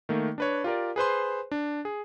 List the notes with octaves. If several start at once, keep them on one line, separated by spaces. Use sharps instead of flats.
D#3 A3 A#3
D4 B4 C#5
F4 G4 A#4 D5
G#4 B4 C5 C6
D4
G#4